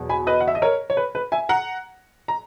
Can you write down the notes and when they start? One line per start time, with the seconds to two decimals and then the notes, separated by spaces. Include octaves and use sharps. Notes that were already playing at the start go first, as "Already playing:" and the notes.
Already playing: E2 B2 F#3
0.09 G#5 B5
0.27 B4 D#5
0.40 F#5
0.48 E5
0.55 D#5
0.62 A#4 C#5
0.90 C#5
0.97 B4
1.15 B4
1.32 E5 G#5
1.49 F#5 A#5
2.28 A#5